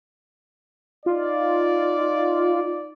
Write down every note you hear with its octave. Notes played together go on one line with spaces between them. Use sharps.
D#4 F4 D5